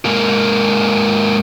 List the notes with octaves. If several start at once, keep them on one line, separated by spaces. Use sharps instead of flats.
G#2 A#3